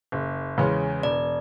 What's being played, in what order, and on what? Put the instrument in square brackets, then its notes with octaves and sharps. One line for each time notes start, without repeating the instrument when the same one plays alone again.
[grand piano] F#1
E2 C#3 G#3 C#4
[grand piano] E1 [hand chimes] D5